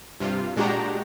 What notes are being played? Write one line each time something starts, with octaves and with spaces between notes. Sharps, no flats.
G2 C3 F4
A#2 G#3 D4 F#4 G4 A#5